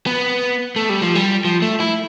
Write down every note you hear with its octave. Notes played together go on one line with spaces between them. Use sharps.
B3
A3
G3
F3
G3
F3
A3
E4